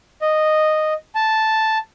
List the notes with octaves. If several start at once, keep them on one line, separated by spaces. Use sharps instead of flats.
D#5
A5